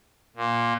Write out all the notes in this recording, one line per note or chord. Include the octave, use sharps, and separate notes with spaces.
A#2